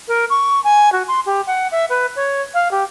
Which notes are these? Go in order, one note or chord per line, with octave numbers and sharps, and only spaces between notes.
A#4
C#6
G#5
F#4
C6
G4
F#5
E5
B4
C#5
F5
G4